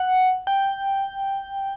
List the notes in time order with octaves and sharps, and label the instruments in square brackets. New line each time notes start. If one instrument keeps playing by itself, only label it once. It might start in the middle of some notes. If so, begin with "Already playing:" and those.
Already playing: [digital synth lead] F#5
G5